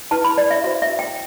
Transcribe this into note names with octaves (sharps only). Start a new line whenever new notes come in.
E4 B4 A5
B5
D5
E5
F#4 C5 E5
E5
G5